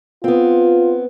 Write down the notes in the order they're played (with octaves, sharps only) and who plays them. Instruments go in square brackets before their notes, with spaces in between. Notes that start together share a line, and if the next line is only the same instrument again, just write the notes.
[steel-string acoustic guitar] B3 C4 [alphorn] F4